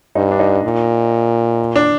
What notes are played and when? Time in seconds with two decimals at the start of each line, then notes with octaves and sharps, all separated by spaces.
0.15 G2 D#4
0.31 D4
0.40 D#4
0.64 A#2
1.76 D4